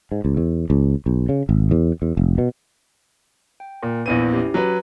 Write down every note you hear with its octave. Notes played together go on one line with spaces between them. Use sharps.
G#2
C#2
E2
C#2
B1
C#3
G#1
E2
E2
F1
B2
G5
A#2
A#1 E2 E4 B4 D#7
C#4 G4
F#3 B4